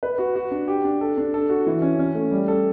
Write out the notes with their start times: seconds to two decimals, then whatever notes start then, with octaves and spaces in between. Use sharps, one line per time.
0.03 B4
0.18 F#4
0.35 F#4
0.51 D4
0.68 G4
0.84 D4
1.01 A4
1.18 D4
1.34 A4
1.49 F#4
1.67 E3
1.82 C#4
1.99 C#4
2.15 A3
2.31 G3
2.48 A4